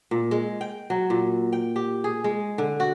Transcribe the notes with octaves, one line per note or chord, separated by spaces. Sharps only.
A#2
G#3
G5
F#3
A#2
G5
G4
G#4
G#3
D3
F#4